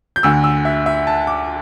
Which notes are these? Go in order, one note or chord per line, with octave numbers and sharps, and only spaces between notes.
G6
D2 D3 E6
E6
E5
E5
A5
D6